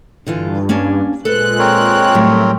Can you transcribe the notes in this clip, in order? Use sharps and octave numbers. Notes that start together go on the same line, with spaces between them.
G2 D3 E3 F4
A#3 C#4 D4
A#2 G#3 A4 B4 C5 F#6
C4 A#4 C#5
A2 F#3 G3 A3